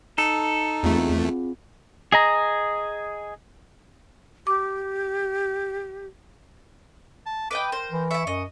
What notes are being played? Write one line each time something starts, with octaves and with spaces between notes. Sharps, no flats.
D#4 A4
E2 A3 C4 F4 G#4
G#4 D#5 A#5
G4 D6
A5
B4 D#5 G5 D6
A#4 C5
E3
E4 E5 C#6
F#2 D#5